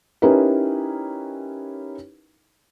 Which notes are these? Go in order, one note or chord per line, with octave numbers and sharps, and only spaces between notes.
C#4 D#4 E4 G4 A#4 B4